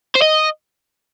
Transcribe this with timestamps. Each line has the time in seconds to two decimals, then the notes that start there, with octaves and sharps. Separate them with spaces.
0.15 C5
0.22 D#5